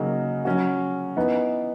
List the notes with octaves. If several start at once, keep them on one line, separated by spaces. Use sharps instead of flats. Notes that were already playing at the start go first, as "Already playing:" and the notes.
Already playing: C#3 F#3 A#3 D#4 F#4
F#3 C#4 F#4
E3 B3 D#4